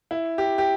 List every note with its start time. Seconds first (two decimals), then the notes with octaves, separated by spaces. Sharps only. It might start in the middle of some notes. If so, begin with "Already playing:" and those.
0.11 E4
0.38 G4
0.58 G4